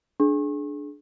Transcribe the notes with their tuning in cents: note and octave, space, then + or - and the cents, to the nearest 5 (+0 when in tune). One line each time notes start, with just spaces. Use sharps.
D4 +0 G#4 +30 C#6 -35